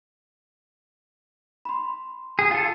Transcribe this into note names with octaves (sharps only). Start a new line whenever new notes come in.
B5 C6
G#4 D#7
F4 A4